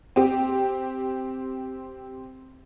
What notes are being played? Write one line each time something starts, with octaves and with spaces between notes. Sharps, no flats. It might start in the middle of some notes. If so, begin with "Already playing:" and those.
C4 G4